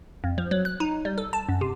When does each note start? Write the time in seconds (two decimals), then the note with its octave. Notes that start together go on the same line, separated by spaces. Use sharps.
0.24 F2
0.38 F3
0.51 F#3
0.65 F#6
0.80 D#4
1.05 G3
1.18 A4
1.33 A5
1.49 F#2
1.61 C3